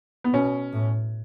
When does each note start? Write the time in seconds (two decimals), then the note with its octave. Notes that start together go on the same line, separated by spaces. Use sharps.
0.24 B3
0.34 B2 C#4
0.73 A2